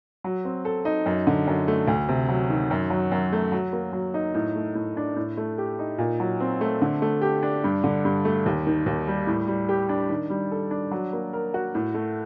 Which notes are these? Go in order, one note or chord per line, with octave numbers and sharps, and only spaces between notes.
F#3
C4
A4
D#4
F#2
D3
F#2
A3
D2
C3
F#3
D#3
F#2
F#3
F#2
A3
F#3
A#3
F#3
D#4
A2
A3
A2
D4
A2
A3
G4
D#4
A#2
F#3
C4
A3
D3
A3
G4
D4
G2
D3
G2
A3
D#2
D#3
D#2
G3
A2
G3
G4
D4
D#3
G3
A4
D4
F#3
A#3
A#4
F#4
A2
A3